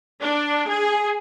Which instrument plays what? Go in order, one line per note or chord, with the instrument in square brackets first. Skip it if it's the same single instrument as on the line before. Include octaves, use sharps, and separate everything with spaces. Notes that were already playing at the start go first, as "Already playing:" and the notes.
[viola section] D4
G#4